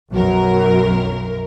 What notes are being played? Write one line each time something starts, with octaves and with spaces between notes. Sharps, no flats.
B1 F#2 F#3 A#4